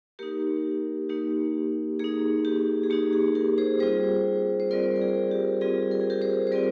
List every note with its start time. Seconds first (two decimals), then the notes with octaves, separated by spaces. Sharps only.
0.19 A#3 D#4 G4 A#4
1.09 A#3 D#4 G4
1.99 A#3 D#4 G#4
2.45 G4
2.83 G#4
2.90 A#3 D#4 G4
3.13 G#4
3.35 G4 A#4
3.58 G#4 C5
3.80 G3 C4 F4 G#4 C5
4.60 C5
4.71 G3 C4 F4 A#4 D5
4.96 A#4
5.02 G#4
5.31 G4
5.61 G3 C4 F4 G#4
5.91 A#4
6.01 G#4
6.10 G4 A#4
6.22 G#4 C5
6.47 C5
6.51 G3 C4 F4 A#4 D5